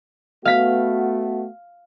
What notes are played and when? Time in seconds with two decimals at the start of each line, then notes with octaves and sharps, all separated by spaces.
0.45 A3 B3 F#4 F5 B6